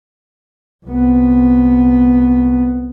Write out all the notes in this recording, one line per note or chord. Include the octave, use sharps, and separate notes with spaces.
C2 B3